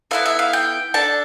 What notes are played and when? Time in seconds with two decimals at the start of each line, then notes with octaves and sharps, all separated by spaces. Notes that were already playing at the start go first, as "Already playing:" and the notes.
0.11 B3 E4 A4 F5
0.26 E5
0.39 F5
0.53 G5
0.94 D4 A4 A5